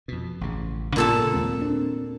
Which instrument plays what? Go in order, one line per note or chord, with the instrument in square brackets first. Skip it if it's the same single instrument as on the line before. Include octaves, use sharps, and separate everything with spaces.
[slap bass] F2 B2
A1 C#3
[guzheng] A#2 A4 A5 [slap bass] C#3 G3 B3
[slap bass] D#2 G#3 C4
C4 D4